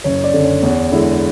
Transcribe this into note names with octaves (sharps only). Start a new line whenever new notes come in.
F#1 C#5
D5
F#2 D3
C#5
E2 C#5
D3 G#3 E4